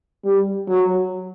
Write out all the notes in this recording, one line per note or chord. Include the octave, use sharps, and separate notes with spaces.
G3
F#3